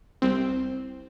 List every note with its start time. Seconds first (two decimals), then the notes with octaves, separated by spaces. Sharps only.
0.22 C2 C4